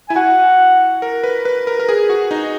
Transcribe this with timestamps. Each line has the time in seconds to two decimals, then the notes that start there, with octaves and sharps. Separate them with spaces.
0.09 E4 G#5
0.16 F#4 F#5
1.02 A#4
1.23 B4
1.45 B4
1.67 A#4
1.79 A#4
1.89 G#4
2.09 F#4
2.31 D#4